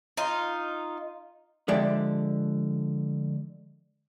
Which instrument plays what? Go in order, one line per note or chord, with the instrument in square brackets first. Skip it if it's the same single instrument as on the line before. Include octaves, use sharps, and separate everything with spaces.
[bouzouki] D#4 F4
[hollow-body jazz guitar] D3 F3 G#3 G4 D5 E5